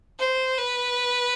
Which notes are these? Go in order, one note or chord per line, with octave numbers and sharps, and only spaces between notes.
C5
B4